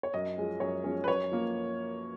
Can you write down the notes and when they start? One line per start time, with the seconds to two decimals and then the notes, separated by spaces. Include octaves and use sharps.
0.03 C#5
0.14 F#2 D#5
0.37 F3 G#3 C#4
0.60 F#2 C#5
0.84 F3 G#3 C#4
1.04 B4
1.08 F#2 C#5
1.32 F3 A#3